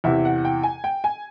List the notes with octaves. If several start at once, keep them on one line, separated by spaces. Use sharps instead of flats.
E2 C3 E3 E5
F#5
G5
G#5
G5
G#5